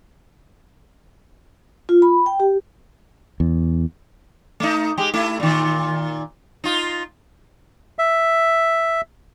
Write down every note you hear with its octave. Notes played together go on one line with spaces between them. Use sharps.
F4
B5
G5
G4
E2
A3 D#4
G#3 G4
A3 E4
A#2 D#3
D#4 F4
E5